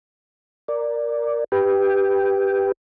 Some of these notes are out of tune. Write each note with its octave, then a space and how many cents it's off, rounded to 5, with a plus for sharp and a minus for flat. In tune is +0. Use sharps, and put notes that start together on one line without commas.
A#4 +0 D5 +0
G4 +5 B4 +0 G5 +0